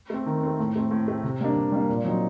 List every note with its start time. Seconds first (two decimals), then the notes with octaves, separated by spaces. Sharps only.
0.10 A3 C4
0.26 D#3
0.43 A3 C4
0.59 A2
0.76 A3 C4
0.91 A2
1.08 A3 C4
1.23 C3
1.41 G3 A#3 D4
1.56 C3
1.72 G3 A#3 D4
1.89 A#2
2.05 F#3 C4 D#4